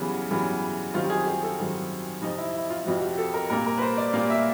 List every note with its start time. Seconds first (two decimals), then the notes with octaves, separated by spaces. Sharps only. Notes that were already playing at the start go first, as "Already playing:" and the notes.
Already playing: F#2 C#3 E3 G3 B3
0.31 F#2 C#3 E3 G3 B3
0.94 F#2 D#3 G3 C4 F4
1.04 G4
1.10 G#4
1.26 G#4
1.43 A4
1.58 F#2 D#3 G3 C4
2.22 F2 C3 F3 D#4
2.38 E4
2.55 E4
2.70 F4
2.85 F2 C3 F3 F#4
3.02 G4
3.18 A4
3.34 A#4
3.50 A#2 G3 A#3 A#4
3.66 A#4
3.78 B4
3.82 C5
3.98 D5
4.13 A#2 G3 A#3 F5
4.30 E5